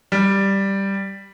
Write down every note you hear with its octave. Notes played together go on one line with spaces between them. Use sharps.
G3